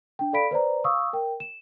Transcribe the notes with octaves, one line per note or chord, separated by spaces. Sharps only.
D4 G5
A4 D5 F5 B5 B6 D7
B4 C5 D5 A#5
F5 C#6 D#6 E6
A#4 G5
E7